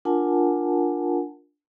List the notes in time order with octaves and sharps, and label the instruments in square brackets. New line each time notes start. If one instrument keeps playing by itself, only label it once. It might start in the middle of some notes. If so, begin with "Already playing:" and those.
[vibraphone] D4 F4 A#4 F#5 G#5 A5